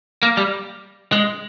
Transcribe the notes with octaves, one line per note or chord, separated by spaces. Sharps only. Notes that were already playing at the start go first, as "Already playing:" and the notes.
A#3
G3
G#3